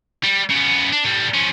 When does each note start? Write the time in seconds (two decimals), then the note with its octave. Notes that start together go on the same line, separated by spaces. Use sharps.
0.24 G3
0.50 C#3 B3
0.92 D4
1.05 A2 G3
1.34 F3 C#4